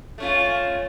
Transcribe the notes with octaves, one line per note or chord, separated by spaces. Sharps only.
A3 C#4 F4